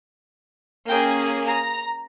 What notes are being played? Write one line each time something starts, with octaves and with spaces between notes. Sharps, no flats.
A#3 C#4 G#4 G5
A#5